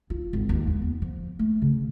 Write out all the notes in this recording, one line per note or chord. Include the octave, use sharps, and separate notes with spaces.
F4
G#1
D#2
E2
B3
F3
A3
C#3